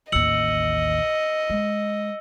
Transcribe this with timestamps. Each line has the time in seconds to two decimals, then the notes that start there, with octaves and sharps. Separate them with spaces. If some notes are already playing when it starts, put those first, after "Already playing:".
0.12 A1 D#2 D#5 E6 C#7 F#7
1.50 G#3